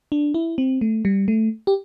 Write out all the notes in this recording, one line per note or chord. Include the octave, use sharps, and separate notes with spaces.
D4
E4
C4
A3
G3
A3
G4